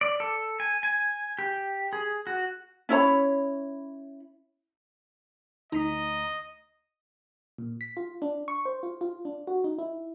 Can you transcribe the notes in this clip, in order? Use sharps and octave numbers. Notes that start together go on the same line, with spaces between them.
D5
A4
G#5
G#5
G4
G#4
F#4
C#4 E4 C#5 B5
D2 D#4 D#5 A#5 B6
A#2
B6
F4
D4
C#6
C5
F4
F4
D4
F#4
D#4
E4